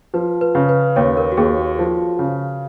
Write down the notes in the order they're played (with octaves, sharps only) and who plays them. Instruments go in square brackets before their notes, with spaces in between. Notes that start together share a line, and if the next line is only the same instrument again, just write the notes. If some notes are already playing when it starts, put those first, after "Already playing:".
[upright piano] F3 [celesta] B4
[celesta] B4
[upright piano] C#3
[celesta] B4
[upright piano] D#2 [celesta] C#5
[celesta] A#4
F#4
[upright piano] D#2 [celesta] G#4
[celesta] F#4
[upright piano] F3
C#3